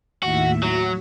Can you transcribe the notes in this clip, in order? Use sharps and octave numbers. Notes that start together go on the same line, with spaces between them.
D#2 A2 F#4 E5
F#3 F#4